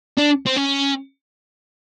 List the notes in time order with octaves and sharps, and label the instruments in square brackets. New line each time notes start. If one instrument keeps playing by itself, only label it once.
[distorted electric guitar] D4
C4
C#4